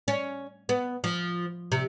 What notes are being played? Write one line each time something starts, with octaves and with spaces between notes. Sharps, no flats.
C#4
B3
F3
C3